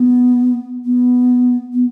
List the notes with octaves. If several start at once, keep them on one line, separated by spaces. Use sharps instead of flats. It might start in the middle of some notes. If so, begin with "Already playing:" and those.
Already playing: B3
B3
B3